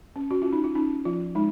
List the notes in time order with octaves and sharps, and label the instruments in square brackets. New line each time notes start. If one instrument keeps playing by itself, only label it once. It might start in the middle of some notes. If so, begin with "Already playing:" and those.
[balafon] C#4
F#4
C#4 F4
D#4
F4
C#4 D#4
F3 F4
G#3 D#4